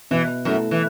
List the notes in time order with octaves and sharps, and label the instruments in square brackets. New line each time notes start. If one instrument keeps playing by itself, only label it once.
[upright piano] B2 [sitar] E3
[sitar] F#2 [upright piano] A3 E4
[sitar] E3